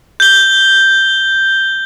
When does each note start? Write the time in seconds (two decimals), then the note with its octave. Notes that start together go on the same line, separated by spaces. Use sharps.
0.20 G6 G7